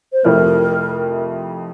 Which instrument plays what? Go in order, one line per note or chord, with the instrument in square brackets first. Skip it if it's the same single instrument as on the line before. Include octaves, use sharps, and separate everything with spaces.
[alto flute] C5
[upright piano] F2 C3 F3 A3 E4 [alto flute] A#4